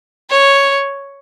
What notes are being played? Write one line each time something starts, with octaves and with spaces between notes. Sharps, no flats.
C#5